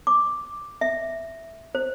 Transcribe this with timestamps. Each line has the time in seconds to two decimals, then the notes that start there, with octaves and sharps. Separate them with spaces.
0.07 D6
0.81 E5
1.75 C5